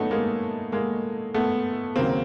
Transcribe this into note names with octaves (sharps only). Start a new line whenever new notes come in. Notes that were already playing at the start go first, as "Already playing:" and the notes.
Already playing: D#3 F#3 A3 B3 C#4 D#4
G#3 A#3
G#3 A#3
A3 B3
D#2 C#3 F#3 A#3 C4